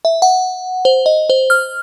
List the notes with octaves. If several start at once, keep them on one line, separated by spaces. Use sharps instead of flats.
E5
F#5
C5
D#5
C5
F6